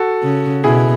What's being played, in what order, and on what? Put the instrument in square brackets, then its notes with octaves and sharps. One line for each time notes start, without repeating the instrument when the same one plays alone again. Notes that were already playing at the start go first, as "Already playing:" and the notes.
Already playing: [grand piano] F#4 A4
[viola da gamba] C#3
[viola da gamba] B2 [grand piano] E4 G#4